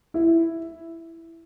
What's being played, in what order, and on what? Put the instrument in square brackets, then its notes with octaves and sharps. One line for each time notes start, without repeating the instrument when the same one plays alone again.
[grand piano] E4